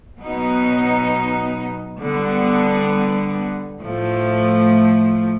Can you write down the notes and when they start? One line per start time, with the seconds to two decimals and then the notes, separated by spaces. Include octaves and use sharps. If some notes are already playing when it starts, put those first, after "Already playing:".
0.19 B2 F#3 B3 D#4
1.99 D3 G3 B3
3.80 A2 F3 A3